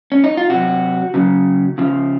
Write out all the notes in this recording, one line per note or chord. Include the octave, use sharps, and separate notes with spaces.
C#4
D#4
F4
C3 F#3 F#4
C#3 F#3
C#3 F3